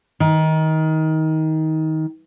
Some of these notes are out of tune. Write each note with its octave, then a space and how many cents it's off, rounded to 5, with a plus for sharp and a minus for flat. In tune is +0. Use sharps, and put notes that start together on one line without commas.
D#3 +20